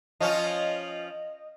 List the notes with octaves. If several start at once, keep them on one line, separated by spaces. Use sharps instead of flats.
F3 C#4 F4 D#5